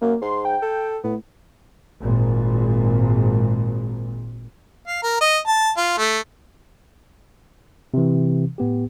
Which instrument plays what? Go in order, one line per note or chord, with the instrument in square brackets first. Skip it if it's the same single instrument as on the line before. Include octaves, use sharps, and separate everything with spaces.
[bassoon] F#2 [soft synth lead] A#3
[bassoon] G#2 [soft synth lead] C6
[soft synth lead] G5
[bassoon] A4
[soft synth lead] A2 [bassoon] B3
[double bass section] G#1 A#2
[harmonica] F5
A#4
D#5
A5
F4
A3
[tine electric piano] C3 E3
A2 B3 G4